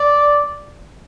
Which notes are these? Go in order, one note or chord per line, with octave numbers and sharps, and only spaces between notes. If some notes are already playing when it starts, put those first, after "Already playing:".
Already playing: D5